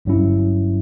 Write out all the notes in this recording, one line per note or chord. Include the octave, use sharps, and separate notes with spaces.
G1 G2 F#3 C#4 E4